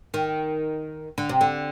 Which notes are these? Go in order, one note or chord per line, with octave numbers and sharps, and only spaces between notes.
D#3
D3
C3
D3